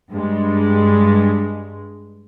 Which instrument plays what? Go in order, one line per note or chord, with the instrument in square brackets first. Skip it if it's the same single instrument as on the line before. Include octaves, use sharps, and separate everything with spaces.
[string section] G2 G#3